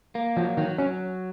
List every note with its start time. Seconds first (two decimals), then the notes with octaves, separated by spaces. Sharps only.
0.15 A#3
0.37 F3 F#3
0.57 D#3 F#3
0.78 F#3 C#4